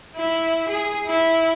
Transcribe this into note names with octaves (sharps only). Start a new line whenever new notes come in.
E4
G#4
E4